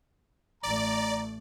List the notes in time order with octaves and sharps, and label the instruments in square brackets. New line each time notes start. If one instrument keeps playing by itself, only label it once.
[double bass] A1 A3 [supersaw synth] D5 [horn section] A#5